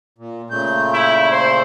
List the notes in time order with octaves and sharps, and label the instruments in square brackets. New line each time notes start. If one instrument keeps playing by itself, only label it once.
[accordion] A#2
[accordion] A#2 C#3 A3 [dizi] G6
[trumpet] E4
C5